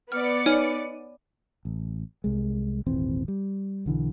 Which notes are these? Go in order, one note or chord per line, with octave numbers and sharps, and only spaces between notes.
B3 D5 F6 C#7
D#4 C#5 G#5 F6
A1
C2 G#3
D#1 G#1 E3 C4
G3
B1 D3 E3